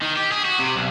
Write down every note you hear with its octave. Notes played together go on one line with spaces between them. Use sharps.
D#3
G4
G#4
F#4
C3
B1